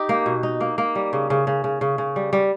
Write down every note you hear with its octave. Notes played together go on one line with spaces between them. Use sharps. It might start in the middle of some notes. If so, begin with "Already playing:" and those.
Already playing: D#4 G4
A#3
B2
D#4
A#3
A#3
G3
C#3
C#3
C#3
C#3
C#3
C#3
G3
G3